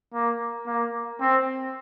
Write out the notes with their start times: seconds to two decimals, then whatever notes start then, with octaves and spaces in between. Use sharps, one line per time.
0.13 A#3
0.67 A#3
1.20 C4